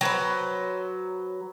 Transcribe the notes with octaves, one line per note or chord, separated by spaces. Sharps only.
F#3 B4 C5